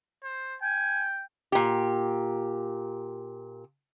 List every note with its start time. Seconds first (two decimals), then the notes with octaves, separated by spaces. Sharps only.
0.24 C5
0.62 G5 G#5
1.52 A#2 G4